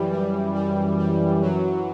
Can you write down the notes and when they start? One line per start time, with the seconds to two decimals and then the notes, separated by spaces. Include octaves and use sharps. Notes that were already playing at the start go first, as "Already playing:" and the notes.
Already playing: F#2 E3 G3
0.13 G3
0.55 G3
0.99 G3
1.42 F#2 E3 F#3